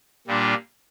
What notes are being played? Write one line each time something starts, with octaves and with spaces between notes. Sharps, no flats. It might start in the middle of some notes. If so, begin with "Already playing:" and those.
A#2 G3 D4 F4